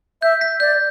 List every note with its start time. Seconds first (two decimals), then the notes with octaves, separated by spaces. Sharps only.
0.22 E5 G6
0.41 B6
0.60 D5 G6